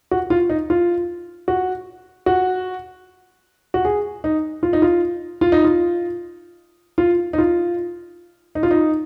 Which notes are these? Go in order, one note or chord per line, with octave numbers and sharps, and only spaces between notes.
F#4
F4
D#4
F4
F#4
F#4
F#4
G#4
D#4
F4
D#4
F4
F4
D#4
F4
F4
D#4
F4
D#4
F4
D#4